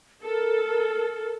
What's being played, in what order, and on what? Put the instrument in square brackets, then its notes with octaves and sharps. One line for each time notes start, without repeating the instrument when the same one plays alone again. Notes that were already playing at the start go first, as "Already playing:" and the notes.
[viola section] A4 [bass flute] A#4